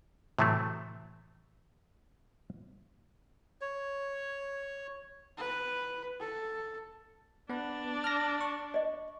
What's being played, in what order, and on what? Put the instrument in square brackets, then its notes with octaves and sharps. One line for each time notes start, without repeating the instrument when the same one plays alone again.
[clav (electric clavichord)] A2 C3 E3 F#3 A3
[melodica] C#5
[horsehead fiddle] B4
A4
[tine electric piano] B3 B4 [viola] D4
[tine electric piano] F6 A#6
C#6
[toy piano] D5 D#5